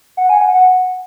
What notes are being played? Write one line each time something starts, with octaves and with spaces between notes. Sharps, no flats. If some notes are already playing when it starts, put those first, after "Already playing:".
F#5
G#5
F#5
F#5